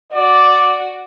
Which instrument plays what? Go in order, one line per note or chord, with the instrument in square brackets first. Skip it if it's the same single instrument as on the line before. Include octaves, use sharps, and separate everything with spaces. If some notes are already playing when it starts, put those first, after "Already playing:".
[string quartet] F#4 [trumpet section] D5